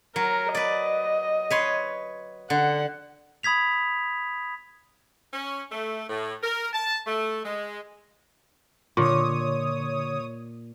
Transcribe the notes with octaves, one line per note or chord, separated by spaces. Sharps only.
F#3 A#4
B4 D5 D#5
B4 C#5 C6
D3 F#5
B5 D#6 G#6 B6 F7
C#4
A3
A2
A#4
A5
A3
G#3
A#2 D3 C#5 C#6 D#6